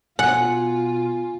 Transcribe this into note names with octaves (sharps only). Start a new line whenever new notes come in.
B2 F4 F#5 G#5